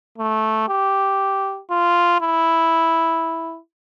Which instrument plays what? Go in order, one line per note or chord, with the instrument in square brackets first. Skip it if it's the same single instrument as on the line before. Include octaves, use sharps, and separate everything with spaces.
[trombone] A3
G4
F4
E4